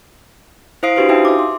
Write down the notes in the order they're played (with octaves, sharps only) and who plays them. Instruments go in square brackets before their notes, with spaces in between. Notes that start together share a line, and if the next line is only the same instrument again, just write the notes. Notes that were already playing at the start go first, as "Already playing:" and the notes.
[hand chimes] E4 C5 F5 D#6 C7 D7
D4 E4 F#4 G4 B4 C5
D#4 E5 F5 G5 D#6
E5 D6
C6